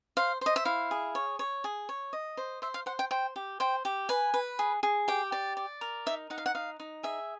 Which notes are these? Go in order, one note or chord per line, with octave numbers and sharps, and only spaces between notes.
C5 F5
C5 D#5
E5
E4 F5
G#4
C#5
C#5
G#4
C#5
D#5
C5
C5 E5
F5
C5 F#5
G5
C5 G5
G4
C5 G5
G4
B4 G#5
B4
G#4
G#4
G4 G5
D5
D5
A#4
D#4 E5
D#4 F#5
F5
F#5
D#4 F5
D#4
G#4 E5